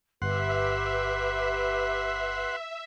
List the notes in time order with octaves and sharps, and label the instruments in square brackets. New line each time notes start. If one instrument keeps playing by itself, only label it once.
[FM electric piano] G1 [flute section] G4 B4 [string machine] E5 [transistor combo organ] F#5 C6